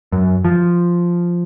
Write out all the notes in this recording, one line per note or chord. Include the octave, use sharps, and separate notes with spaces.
F#2
F3